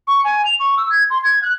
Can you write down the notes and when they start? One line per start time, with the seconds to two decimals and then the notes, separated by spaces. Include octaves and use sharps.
0.07 C#6
0.24 G#5
0.45 F7
0.60 C#6
0.77 E6
0.90 G#6
1.10 C6
1.23 G#6
1.42 F#6